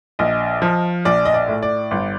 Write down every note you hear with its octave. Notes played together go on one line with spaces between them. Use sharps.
A#1 D#5
F3
A#1 D5
D#5
D5
A2
D5
G1